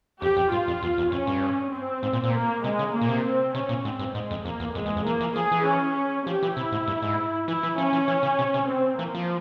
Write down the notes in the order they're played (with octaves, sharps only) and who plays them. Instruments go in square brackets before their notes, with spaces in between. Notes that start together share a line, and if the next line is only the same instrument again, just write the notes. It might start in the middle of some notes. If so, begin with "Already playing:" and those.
[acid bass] F2 [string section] G4
[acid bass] F2
[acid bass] G2 [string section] F4
[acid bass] F2
E2
E2
[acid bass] F2 [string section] C#4
[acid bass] G2
[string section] C4
[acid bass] G#2
A#2
A#2
[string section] A#3
[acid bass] C3 [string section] G#3
[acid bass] C#3
[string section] A#3
[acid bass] A#2
C3
[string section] C4
[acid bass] C3 [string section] C#4
[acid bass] A#2
[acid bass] G#2 [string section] C4
[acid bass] G2
[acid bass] G#2 [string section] G#3
[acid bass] F2
[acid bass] F2 [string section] A#3
[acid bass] E2
[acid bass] F2 [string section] G#3
[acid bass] E2
F2
[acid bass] E3 [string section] A#3
[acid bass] E3
[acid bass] F3 [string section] G#4
[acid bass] E3
[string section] C#4
[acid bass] F3 [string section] G4
[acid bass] E3
[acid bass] C3 [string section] E4
[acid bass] G#2
G2
G#2
[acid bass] E3 [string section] E4
[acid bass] E3
[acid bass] F3 [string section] C#4
[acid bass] E3
E3
C#3
C3
C3
[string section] C4
[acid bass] E3 [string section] A#3
[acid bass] F3